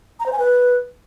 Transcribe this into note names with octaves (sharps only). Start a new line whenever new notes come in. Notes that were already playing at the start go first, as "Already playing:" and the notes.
A#5
C5
G#5
B4